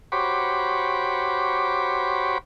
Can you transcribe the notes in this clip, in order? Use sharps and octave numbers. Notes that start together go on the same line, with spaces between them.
F#4 G4 C5 C#5 B5 D6